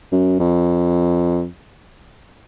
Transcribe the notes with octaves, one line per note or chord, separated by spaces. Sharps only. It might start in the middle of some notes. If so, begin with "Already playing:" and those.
F#2
F2